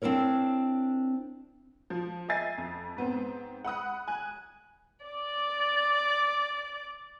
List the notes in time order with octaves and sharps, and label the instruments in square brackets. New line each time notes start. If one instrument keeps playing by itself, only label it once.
[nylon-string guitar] C4 D4 E4 A#4 C#5
[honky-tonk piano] F3
D#5 E5 G#5 A6 C7
F2
G#2 B3 C4
F#5 B5 D#6 F#6
G#5 F#6
[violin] D5 D6